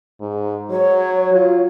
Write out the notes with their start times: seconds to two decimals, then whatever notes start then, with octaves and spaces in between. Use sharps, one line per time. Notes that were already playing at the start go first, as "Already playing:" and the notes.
0.21 G#2
0.70 F#3 C#5
1.35 F4